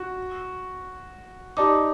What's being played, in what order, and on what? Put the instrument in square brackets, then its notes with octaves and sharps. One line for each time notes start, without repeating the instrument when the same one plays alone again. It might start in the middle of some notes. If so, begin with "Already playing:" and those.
Already playing: [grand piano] F#4
[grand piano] D#4 [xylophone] G4 D5 A5 D6